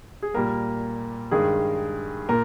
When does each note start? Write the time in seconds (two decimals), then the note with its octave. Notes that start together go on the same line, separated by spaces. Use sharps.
0.23 G#4
0.34 A#2 G3 A#3 A#4
1.31 G2 D#3 G#3 G#4
2.29 A#2 A#4